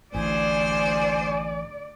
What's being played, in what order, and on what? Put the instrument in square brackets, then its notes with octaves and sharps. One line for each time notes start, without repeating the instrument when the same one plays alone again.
[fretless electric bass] A1 [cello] D2 C5 [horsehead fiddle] D5 [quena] G#5